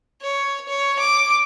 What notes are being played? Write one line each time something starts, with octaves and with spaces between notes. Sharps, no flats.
C#5
C#5
D6